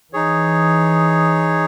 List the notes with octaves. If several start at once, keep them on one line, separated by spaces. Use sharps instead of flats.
E3 D#4 G#4 C#5